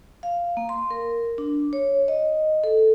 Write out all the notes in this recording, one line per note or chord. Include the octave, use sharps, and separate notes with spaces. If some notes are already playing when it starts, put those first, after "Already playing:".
F5
A#3
C6
A#4
D4
C#5
D#5
A4